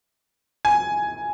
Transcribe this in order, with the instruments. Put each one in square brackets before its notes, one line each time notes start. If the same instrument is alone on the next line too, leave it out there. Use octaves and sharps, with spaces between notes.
[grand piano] G#5